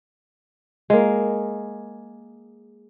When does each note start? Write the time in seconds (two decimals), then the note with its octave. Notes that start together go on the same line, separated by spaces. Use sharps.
0.90 G#3 A#3